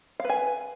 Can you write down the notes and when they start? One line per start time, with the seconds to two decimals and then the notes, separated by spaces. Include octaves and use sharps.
0.20 F5
0.24 B4
0.29 G#5